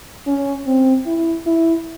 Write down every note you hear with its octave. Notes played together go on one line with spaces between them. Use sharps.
C#4
C4
E4
E4